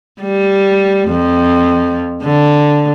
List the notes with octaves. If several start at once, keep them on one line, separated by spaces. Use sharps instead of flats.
G3
F2
D3